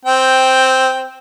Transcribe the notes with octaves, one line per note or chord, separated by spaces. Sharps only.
C4 G5